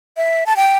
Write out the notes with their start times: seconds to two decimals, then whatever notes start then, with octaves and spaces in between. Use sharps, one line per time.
0.17 E5
0.46 A5
0.56 G5